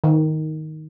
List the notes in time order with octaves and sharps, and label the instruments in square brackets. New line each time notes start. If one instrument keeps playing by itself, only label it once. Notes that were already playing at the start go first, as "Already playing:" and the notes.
[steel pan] D#3